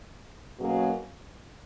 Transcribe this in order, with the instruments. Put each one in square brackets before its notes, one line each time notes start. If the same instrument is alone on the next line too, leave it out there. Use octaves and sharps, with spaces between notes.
[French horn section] B2 F#3 A#3 C#4 G#4